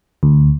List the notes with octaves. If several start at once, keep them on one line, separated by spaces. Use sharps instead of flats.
D2